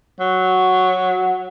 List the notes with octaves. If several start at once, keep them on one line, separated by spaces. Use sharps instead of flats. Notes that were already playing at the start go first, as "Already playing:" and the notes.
F#3